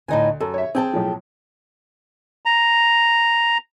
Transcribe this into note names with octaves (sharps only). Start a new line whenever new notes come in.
D2 A2 D#4 G#5
F#2 A4
C#5 E5
C4 G#4 G5 A5
B1 A2 F3
A#5